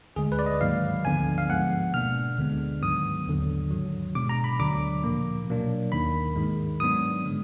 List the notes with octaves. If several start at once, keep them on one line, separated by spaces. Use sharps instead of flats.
D2 D3 G#3 G#4
B4
D5
D#5
G#2 D#3 F#3 A#3 F5
D2 D3 F3 B3 D4 G#5
F5
G#2 F3 G#3 B3 F#5
B2 A#3 D4 F6
D2 D3 G#3 B3 D4
G#2 D#3 F#3 B3 D#6
D#2 D3 F#3
G#2 D#3 F#3
B2 G#3 D4 D6
A#5
B5
D2 D3 F#3 D4 D6
A#2 F3 A#3
B2 F#3 A#3 D4
D#2 D#3 A#3 B5
G#2 D#3 G#3
G#2 F#3 B3 D4 D#6
D3 G#3